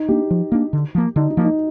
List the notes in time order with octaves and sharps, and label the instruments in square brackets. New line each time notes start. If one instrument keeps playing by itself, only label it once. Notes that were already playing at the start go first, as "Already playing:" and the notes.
Already playing: [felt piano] D#4
[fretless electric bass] A#3 D4 [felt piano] G4
[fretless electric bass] F3
A#3 D4
D3
F3 A#3
[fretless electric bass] D3 [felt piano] D#4
[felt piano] D#4
[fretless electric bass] F3 A#3
[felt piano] D#4